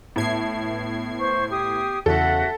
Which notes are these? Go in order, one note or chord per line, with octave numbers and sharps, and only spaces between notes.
A2 B3 G#6 C7
C5 C#6
G4 D#6
E2 C#3 F#4 A4 E5 F#5